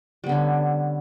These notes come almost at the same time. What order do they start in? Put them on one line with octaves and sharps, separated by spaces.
G3 B3 D3 C#4